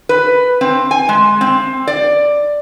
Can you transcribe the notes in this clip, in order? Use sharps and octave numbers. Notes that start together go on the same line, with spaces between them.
B4
C4
G#5
G#3
C4
D5